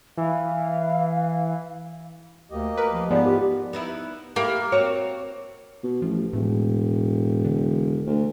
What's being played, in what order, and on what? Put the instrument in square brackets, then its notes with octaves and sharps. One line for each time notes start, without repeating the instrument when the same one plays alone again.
[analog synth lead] E3 [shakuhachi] F5
[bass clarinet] D2 [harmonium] A#3 G4 D#5
[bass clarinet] A#4 [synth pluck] B4
[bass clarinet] F3
[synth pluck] G#2 F3 G#3 [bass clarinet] B3 [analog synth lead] D5
[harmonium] E3 F4 [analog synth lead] G4
[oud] B3 D#4 E4
[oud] A3 E4 G4 [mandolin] A#3
[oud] C4 F#4 C#5
[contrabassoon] B2
[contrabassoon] A1 [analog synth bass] F3
[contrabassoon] E1 [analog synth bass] A2
[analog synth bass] D3
[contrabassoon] D2